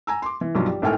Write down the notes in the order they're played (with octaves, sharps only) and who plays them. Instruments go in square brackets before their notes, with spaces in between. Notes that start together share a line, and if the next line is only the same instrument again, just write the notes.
[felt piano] G#5 A#5 E6
C6 D6
E3
B1 G2 F3 F#3 F4
G3
G#1 A2 A4 G5 G#5 F6